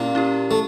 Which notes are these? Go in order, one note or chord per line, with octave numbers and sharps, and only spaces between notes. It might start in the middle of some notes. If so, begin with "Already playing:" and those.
Already playing: A#2 A#3 C#4 E4 G4
C#4 E4 G4
A3